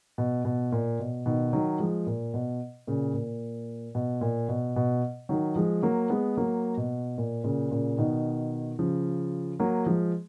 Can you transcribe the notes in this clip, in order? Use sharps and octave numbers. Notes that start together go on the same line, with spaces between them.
B2
B2
A#2
B2
B2 D#3
D#3 F#3
F3 G#3
A#2
B2
A#2 C#3
A#2
B2
A#2
B2
B2
D#3 F#3
F3 G#3
F#3 A#3
G#3 B3
F#3 A#3
B2
A#2
A#2 C#3
A#2 C#3
B2 D#3
C#3 F3
F#3 A#3
F3 G#3